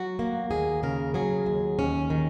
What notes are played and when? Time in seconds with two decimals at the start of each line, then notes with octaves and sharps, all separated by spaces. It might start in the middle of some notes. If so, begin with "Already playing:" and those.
Already playing: F#3 F#4
0.19 A#3
0.50 D#2 G#4
0.83 C#3 A#4
1.14 F#3 G#4
1.46 D#2
1.79 D#2 C#4
2.10 D#3